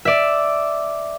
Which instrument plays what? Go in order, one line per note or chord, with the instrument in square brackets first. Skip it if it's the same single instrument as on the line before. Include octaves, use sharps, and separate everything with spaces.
[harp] D5 E5